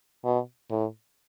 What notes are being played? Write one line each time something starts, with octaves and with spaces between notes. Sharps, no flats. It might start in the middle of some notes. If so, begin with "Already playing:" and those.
B2
A2